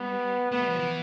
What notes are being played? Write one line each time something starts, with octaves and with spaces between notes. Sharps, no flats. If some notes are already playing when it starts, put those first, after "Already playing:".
Already playing: G3 B3
A3 B3
G3
F3
E3